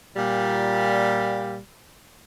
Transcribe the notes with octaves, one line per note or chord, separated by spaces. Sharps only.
A#2 G3